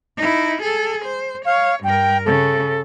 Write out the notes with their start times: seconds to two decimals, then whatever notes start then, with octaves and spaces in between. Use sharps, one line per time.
0.17 D#4 E4
0.62 G#4 A4
1.05 C5
1.45 C#5 F5
1.84 G2 A#4 G5
2.25 C#3 A4